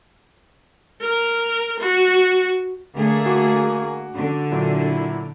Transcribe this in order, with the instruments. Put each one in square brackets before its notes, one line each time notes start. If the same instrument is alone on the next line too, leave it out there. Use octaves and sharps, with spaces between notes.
[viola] A#4
F#4
[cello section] D3 A3 G#4 [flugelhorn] A#3
[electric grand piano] F#4 D6
[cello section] D3
[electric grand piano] A#2 F#3 [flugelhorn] E4